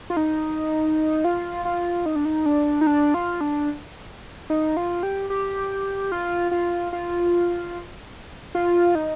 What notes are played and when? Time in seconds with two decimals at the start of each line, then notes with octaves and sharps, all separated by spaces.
0.10 F4
0.17 D#4
1.24 F4
1.65 F4
2.06 D#4
2.16 D4
2.25 D#4
2.46 D4
2.81 D#4
2.87 D4
3.14 F4
3.41 D4
4.50 D#4
4.77 F4
5.03 G4
5.30 G4
6.12 F4
6.51 F4
6.93 F4
8.55 F4
8.95 D#4